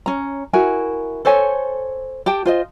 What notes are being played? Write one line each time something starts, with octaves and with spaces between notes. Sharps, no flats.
C#4 A#5
E4 F#4 A#4 G#5
A4 C5 C#5 G#5
G4 G5 A5
F4 C5 D#5